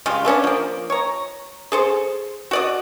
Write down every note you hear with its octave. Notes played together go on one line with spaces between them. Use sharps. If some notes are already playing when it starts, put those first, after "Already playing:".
C#3 G3 G#3 F4
A3 B3 C#4 D4
F3 A#3
C#5 A#5
G#4 A4 C5
F#4 D5 D#5